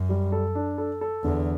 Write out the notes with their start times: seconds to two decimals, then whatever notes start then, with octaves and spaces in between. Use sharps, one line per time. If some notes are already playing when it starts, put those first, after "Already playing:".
Already playing: F#2
0.09 G3
0.32 A4
0.55 D4
0.78 A4
1.01 A4
1.24 E2 D3